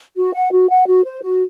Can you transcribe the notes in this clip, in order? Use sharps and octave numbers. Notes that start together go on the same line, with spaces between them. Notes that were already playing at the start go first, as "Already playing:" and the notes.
F#4
F#5
F#4
F#5
F#4
C5
F#4